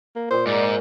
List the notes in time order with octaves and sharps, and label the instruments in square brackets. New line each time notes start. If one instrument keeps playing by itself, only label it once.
[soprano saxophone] A#3
[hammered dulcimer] A#2 D6 [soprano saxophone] C5
[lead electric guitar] G#2 [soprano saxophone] D5